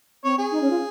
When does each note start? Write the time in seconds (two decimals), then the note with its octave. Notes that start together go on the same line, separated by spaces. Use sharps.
0.24 C4 C#5
0.38 G#4
0.52 D#4
0.61 C#4
0.70 F4